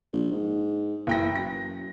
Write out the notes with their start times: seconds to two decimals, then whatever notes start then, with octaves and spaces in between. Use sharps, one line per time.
0.13 A#1
0.31 G#2
1.07 F#1 E3 G5 A#6
1.35 F#2 A#6